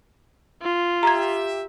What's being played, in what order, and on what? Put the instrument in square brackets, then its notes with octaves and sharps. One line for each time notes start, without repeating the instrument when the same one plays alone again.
[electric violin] F4
[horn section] G4 E5 [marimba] A#5 G#6